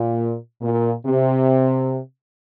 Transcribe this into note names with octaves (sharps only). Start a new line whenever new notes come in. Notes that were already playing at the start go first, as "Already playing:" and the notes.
Already playing: A#2
A#2
C3